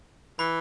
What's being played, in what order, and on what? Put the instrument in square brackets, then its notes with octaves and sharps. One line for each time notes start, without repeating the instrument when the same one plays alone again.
[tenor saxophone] E3 [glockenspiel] B5